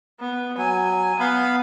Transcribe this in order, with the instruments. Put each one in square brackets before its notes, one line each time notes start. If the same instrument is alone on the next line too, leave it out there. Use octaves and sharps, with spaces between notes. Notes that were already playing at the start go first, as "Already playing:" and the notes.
[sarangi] B3
[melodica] F#3 [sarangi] G#5
[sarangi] B3 [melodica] F5 B5